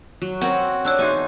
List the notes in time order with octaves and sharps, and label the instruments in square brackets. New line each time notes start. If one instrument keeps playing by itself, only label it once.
[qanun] F#3
[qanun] C4 [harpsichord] C#4 A#4 [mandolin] F#4
[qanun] D4 [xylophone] C#5 E6 F#6
[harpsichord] E2 F#4 C5 [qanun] D#4 G#5